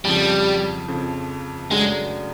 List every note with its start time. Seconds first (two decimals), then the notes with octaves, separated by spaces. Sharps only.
0.05 F2 C#3 F3 G3
0.88 F2 C#3 F3
1.71 F#2 C#3 F#3 G#3 A3 D4